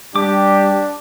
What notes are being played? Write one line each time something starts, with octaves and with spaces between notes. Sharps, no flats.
G3 D4 G4 D6